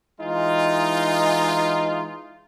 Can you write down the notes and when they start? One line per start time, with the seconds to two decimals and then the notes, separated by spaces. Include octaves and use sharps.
0.20 E3 G#3 D#4 F4